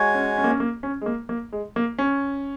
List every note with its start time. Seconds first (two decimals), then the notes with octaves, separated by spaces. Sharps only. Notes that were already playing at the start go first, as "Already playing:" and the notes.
Already playing: G#3 F#4 C#5 G#5
0.15 C#4
0.38 C#4
0.44 A#3
0.51 C#4
0.60 A#3
0.83 C#4
1.01 G#3
1.06 A#3
1.29 A#3
1.52 G#3
1.76 A#3
1.98 C#4